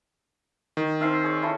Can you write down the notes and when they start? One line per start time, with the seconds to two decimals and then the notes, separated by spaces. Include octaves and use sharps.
0.77 D#3
1.01 C4 D#4 E5 F6 C7
1.24 G#4 C#5
1.42 C#4 E4 A4